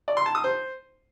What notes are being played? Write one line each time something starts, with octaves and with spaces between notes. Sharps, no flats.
D5
C6
A5
D#6
C5